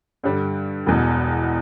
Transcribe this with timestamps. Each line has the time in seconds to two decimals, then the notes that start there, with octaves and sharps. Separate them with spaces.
0.23 G2 D3 G3
0.86 E1 E2 B2